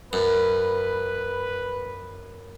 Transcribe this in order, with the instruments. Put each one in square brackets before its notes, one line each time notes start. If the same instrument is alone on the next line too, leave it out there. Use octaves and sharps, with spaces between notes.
[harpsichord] F#2 [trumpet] B4